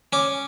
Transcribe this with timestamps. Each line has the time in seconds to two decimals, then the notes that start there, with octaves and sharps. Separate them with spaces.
0.13 C#4 D6